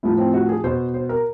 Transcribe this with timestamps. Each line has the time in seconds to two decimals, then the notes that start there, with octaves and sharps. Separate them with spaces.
0.03 A2 F3 E4
0.18 C4
0.34 F#4
0.49 G#4
0.64 B2 C5
0.94 C5
1.09 A#4